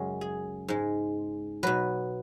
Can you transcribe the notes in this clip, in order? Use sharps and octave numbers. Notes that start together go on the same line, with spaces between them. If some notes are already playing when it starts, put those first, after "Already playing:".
Already playing: F#2 C#3 G#3
G#4
G#2 G#3
B2 F#3 B4